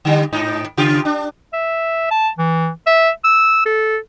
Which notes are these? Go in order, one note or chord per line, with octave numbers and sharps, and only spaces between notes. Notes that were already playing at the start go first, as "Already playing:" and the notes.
D3 G3
G#2 D#4
C#3 F4 G4
D4
E5
A5
E3
E5
E6
A4